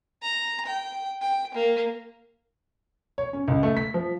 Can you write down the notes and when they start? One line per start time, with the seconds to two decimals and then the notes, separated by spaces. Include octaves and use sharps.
0.22 A#5
0.65 G5
1.21 G5
1.54 A#3
3.18 C#5
3.33 C#4
3.48 C#2
3.63 A3
3.77 B6
3.94 F3